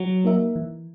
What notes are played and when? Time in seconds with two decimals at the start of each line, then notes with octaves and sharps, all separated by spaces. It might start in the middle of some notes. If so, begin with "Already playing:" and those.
Already playing: F#3
0.24 A#3 D#4 A#4 E5
0.56 E3